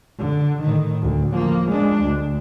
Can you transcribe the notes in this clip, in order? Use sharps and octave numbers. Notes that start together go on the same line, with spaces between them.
D3
A2 D#3
D2
F3 A#3
G#3 D4
D2